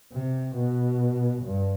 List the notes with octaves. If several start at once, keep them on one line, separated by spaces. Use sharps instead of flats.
C3
B2
G2